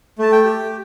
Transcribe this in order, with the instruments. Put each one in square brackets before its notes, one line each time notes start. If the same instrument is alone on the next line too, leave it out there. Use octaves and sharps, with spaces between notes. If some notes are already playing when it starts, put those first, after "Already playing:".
[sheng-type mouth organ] A3 A5
G5
G4